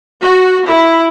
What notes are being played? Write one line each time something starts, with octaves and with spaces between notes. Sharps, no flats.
F#4
E4